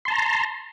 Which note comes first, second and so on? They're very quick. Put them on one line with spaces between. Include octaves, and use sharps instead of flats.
C6 A5 A#5